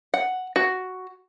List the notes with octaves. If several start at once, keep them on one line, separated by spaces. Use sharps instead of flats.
F#5
F#4